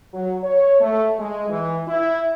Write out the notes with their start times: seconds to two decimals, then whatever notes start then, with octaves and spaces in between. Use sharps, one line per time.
0.14 F#3
0.44 C#5
0.81 A3
1.19 G#3
1.49 E3
1.88 E4